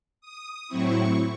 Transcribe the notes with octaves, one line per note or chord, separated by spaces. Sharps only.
D#6
A2 F#3 C4 E4 C#6